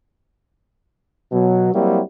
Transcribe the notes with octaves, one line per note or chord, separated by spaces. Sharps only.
B2 F#3
F#3 G3 A#3 C4 E4 F#4